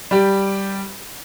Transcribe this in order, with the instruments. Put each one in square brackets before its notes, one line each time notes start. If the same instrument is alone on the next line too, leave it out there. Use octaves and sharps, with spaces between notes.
[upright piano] G3 G4